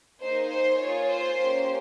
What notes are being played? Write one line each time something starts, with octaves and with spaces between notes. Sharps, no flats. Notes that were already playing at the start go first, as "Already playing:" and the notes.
A#3 D#4 G#4 C5
C5
A#3 F4 G#4 C#5
C5
A#3 C#4 G4